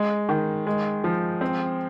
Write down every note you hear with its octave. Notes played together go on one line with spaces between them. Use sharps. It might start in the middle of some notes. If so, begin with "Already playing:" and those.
Already playing: G#3
D#3
G#3
F3
C4